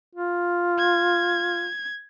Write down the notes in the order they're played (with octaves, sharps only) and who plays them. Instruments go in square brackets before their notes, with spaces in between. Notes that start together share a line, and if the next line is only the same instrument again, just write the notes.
[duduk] F4
[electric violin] G#6